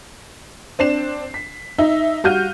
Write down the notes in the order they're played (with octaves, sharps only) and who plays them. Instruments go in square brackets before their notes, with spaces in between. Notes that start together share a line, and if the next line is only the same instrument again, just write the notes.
[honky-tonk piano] C4 D4 C7 E7
B6
D#4 E5
G3 F#4 F5 F6 G6 D#7